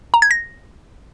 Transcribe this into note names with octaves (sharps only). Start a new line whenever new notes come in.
A#5
G#6
A#6